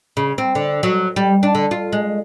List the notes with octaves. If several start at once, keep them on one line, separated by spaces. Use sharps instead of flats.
C#3
C4
D3
F#3
G3
D4
D3
F4
G#3